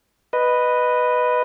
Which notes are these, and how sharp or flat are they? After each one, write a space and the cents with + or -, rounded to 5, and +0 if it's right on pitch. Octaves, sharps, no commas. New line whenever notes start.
B4 +0 D#5 -10